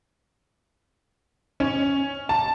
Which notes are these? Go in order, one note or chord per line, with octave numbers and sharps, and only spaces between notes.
C#4
A5